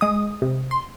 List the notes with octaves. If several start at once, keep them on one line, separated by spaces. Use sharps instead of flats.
G#3 D#6
C3
C6